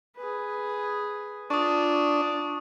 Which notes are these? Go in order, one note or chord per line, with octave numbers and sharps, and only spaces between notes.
G#4 B4
D4 F4 C#6 D#6